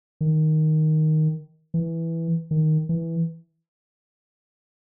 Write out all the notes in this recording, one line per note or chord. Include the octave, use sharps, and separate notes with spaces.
D#3
E3
D#3
E3